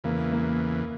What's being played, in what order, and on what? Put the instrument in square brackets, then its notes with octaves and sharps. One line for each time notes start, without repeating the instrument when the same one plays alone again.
[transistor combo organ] E2 C#3 E3 [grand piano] A#3
[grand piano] A#3